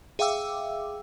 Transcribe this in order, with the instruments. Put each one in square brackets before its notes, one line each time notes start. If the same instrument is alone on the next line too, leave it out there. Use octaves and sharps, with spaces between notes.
[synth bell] G#4 E5 F5 G5 D6 E6